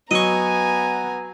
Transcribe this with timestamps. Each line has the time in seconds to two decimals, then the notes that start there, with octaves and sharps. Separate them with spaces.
0.11 F#3 B3 D#5 G#5 A#5 C#6